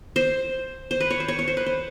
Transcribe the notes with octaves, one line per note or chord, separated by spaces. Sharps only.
C5
C5
B4
C#5
C5
C#5
C#5
C5
B4
C5